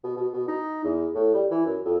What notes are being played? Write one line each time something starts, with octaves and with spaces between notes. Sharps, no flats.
B2
B2
B2
D#4
E2
A2
G3
E3
F#2
F2